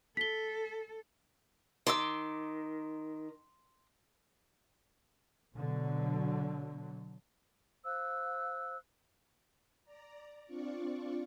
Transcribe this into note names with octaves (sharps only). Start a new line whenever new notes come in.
A4 B6 G7
D#3 C6 D6 E6
B2 D3 F#3
C5 F5 E6 F#6
D5 A#5
C4 D4 F4 D5 C#6